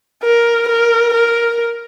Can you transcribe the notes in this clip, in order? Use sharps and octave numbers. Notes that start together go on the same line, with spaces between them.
A#4
A#4
A#4